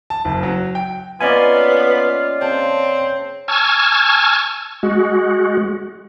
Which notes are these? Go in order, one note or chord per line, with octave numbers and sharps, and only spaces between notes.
A5
F#1
F#3
G5
A#3 B3 C#4 F4 D5 D#5 G#5
C#3 C4 A5
G#5 A5 C#6 E6 F6 G#6
G#3 F#4